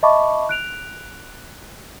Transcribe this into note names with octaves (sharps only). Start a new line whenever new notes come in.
D#5 E5 A5 B5 C#6 D6
F#6 D7 F7